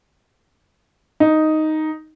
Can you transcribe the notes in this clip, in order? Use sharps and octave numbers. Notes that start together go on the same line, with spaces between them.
D#4